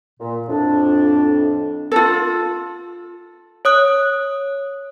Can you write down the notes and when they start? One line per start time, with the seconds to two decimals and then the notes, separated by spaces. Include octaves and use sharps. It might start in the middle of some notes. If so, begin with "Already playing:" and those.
0.20 A#2
0.47 F2 A2 D4
1.92 F4 A4
3.65 C#5 D#6 F#6